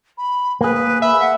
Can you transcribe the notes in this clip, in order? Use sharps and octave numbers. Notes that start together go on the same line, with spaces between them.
B5
A#3 G#4 B4
E5 B5
F#5